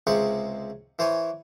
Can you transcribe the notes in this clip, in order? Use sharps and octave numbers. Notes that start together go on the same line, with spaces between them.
C#2 C3 G#3 C5 C#6
E3 C5 C#5 G#5